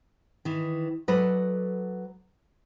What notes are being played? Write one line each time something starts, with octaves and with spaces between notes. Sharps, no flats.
D#3 E3
F#3 A4 B4 D5 D#5